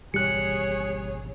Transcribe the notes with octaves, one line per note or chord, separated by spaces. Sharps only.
G#1 B2 E3 G3 G#4 C#5 F#6 C#7